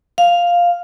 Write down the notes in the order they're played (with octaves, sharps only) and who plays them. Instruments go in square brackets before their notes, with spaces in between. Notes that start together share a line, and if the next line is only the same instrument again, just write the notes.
[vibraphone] F5